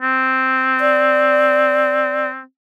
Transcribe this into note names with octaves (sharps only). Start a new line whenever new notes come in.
C4
D5